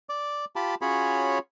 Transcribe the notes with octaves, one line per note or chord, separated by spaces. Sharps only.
D5 D6
F4 G4 A5 B5
C#4 F4 F#4 G#4 C#5 B5